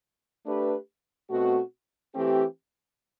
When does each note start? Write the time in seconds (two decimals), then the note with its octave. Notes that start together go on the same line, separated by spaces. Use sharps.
0.46 A3 D4 G4 B4
1.30 B2 A3 C4 F#4
2.14 E3 A3 C4 G4